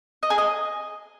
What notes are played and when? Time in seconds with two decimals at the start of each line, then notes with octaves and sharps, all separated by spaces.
0.23 D#5
0.30 G#4
0.38 D#5